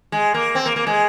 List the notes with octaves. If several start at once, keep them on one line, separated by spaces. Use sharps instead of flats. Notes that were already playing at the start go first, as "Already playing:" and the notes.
G#3
A#3
C4
A#3
A#3
G#3